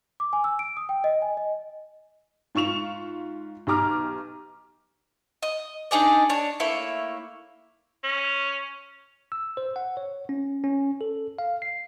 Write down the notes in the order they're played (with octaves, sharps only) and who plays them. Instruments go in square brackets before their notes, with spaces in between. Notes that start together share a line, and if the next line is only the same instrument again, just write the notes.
[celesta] D6
G#5
E6
D7
D#6
G5
D#5
G#5
D#5
[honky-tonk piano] G#2 F4 C#6 E7 F7
B1 G4 A#5 D6 F6
[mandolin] D#5
D4 D#4 G#4 D5
D4 C#5
A3 A#3 E4 C#5
[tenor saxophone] C#4
[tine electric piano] E6
C5
F#5
C#5
C#4
C#4
A4
F5
C7